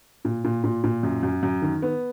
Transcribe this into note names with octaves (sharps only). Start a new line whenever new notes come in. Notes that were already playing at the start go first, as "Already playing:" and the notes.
A#2
A#2
A#2
A#2
F#2
F#2
F#2
D#3
B3